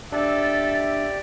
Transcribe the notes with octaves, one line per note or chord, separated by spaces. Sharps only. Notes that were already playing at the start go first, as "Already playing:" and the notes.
D4 G4 A4 D5 E5